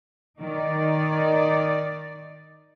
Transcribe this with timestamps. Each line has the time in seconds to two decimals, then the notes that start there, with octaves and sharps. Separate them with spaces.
0.41 D#3 D#4 D5